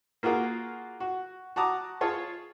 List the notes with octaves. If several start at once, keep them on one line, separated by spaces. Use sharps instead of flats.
A#3 F4 F#4 G#4 A#4
F#4
F#4 A5 A#5 D6 D#6
F4 G#4 C#5 A5